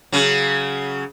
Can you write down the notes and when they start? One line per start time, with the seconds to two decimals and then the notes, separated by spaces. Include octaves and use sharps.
0.12 C#3 F#3